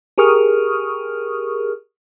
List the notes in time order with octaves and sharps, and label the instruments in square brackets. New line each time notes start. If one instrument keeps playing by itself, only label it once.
[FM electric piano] G4 G#4 A#4 C#6 D#6 F6